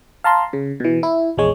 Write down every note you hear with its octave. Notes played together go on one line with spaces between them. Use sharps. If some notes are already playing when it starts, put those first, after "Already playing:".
F5 A5 A#5 C6
C#3
B2 E3
E4
A#1 E2 G#3 C#5